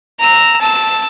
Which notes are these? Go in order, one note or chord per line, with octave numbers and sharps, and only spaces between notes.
A#5 E6
A5 E6